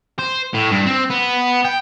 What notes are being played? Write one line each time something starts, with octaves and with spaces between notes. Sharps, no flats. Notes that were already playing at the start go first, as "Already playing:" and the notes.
C5
A2
G2
C4
B3
G5